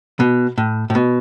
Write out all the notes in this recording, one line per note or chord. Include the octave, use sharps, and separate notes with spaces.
B2
A2
A2
B2